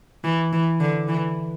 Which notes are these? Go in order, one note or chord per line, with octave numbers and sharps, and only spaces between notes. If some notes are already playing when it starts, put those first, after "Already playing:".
E3
E3
D3
E3